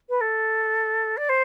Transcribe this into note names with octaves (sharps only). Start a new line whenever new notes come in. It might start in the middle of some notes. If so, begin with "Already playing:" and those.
B4
A4
D5
C5